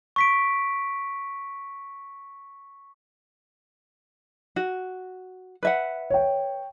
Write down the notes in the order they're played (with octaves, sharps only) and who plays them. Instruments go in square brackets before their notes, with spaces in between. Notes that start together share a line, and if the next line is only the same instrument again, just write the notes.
[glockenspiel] C#6 B6 D7
[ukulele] F#4
B4 E5 F#5
[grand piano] C#5 G5